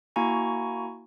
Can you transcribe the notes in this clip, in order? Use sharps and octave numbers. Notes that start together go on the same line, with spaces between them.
A#3 E4 F#4 G#5 A#5 C#6